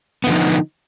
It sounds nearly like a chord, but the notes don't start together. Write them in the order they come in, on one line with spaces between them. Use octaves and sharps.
B3 D3 F3 D#4